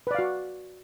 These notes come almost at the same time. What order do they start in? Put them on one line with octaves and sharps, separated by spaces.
B4 D5 F5 F#4